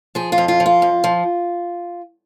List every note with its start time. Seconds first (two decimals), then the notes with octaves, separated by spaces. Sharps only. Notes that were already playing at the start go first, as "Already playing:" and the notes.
0.15 F3 G#4
0.32 F4
0.38 F2
0.48 F4
0.60 F3
0.66 F4
0.82 F2
1.04 F3